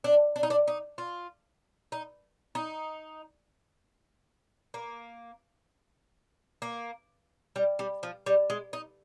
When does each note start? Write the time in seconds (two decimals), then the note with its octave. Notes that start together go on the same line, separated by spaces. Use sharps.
0.04 D4
0.36 D4
0.43 D#4
0.50 D4
0.67 D#4
0.98 F4
1.92 D#4
2.55 D#4
4.74 A#3
6.62 A#3
7.56 G3
7.79 G3
8.03 F3
8.26 G3
8.50 G#3
8.73 D#4